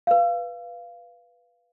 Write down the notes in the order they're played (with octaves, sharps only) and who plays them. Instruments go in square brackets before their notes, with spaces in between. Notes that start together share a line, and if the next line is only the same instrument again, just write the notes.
[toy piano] B4 F5